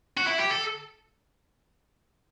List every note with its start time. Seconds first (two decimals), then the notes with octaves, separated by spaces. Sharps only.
0.17 F#4
0.27 E4
0.40 G4
0.51 A4